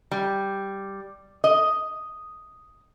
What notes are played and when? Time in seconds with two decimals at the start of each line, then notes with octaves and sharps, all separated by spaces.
0.11 G3
1.44 D#5